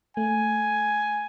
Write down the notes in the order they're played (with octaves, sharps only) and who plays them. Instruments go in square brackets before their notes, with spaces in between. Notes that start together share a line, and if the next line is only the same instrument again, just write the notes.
[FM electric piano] A3 [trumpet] G#5